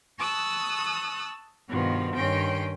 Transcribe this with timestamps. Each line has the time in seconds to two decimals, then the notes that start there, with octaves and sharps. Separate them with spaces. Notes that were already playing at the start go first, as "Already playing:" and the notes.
0.18 A5 C#6 D#6 E6 F#6
1.69 G2 B2 D#3 F3
2.16 G2 D#3 C#4 G5 C6